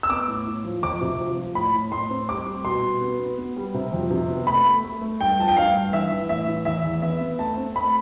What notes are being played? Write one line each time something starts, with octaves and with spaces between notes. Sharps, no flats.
E6
B3 D6
A2
A2
F3
F2 D6
C3
F3
F3
A2 B5
A2
A2 C6
C4
G3 D6
G3
B2 C6
B2
B3
B3
B3
G3
C3
F2
C3
B3
A3 B5
A3
A3
A3
G2 G5
F3 A5
G5
G2 F5
G2
E3 E5
E3
A2 E5
E3
E2 E5
E2
B3 E5
B3
A3 A5
C4
A3 B5